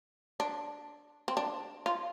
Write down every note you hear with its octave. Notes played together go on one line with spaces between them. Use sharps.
D4
C4
D4
F4